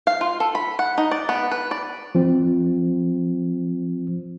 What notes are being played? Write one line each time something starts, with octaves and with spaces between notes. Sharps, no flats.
F5
F4
A4
B5
F#5
D#4
D5
B3
B4
D5
F3 C4